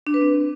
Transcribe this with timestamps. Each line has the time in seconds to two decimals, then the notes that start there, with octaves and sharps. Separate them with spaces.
0.07 D4
0.14 B4
0.21 C4